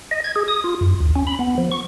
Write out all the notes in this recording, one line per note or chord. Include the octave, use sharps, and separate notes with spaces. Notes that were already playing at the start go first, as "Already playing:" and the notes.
D#5
G#6
G#4
D#6
F4
F#2
D#2
C#4
B5
B3
F3
C#6